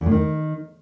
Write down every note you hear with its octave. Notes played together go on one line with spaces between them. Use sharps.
E2
A2
D#3